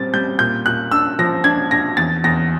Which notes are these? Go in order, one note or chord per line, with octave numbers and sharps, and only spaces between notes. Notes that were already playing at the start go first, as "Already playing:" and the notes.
Already playing: A#2 G3 C4 A6
G3 G6
A#2 G6
A#2 F#6
D4 E6
F3 A#6
D4 G#6
D4 A#6
E2 A6
E2 A#6